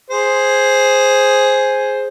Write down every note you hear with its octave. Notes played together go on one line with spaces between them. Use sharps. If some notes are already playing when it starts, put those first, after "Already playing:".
G#4 C5